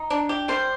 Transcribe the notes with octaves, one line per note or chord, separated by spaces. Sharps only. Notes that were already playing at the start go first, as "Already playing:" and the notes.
Already playing: D#4
D4
G4
G3 C5